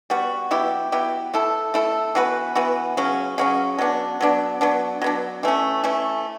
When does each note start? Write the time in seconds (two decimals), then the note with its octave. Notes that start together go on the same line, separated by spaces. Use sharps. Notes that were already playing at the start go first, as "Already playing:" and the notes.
0.10 G3 B3 F#4
0.51 F#3 B3 E4 G4
0.92 F#3 B3 E4 G4
1.34 A3 E4 A4
1.74 A3 E4 A4
2.15 E3 B3 F#4 B4
2.55 E3 B3 F#4 B4
2.97 C#3 F#3 C#4
3.38 C#3 F#3 C#4
3.79 F#3 B3 D4
4.21 F#3 B3 D4
4.61 F#3 B3 D4
5.02 F#3 B3 D4
5.43 E3 A3 C#4
5.84 E3 A3 C#4